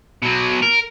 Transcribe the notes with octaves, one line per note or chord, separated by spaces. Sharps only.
B2 F#3
A#4